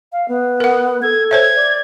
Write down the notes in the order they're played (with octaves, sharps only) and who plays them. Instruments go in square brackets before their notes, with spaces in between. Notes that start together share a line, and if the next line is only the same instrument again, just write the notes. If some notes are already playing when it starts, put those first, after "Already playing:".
[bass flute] F5
B3
[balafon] A#4 F#5
[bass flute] A4 [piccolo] G#6
[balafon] C5 C#5 E5 [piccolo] G#6
[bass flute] D5